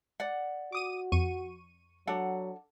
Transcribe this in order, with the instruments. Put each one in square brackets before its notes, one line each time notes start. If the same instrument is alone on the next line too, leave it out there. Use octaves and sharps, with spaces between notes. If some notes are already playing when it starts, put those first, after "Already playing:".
[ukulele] D5 F#5
[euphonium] F#4 [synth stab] D6 D#6 D#7
[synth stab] F2 C#6 D#7
[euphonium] F#3 [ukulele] D4 A4 F#5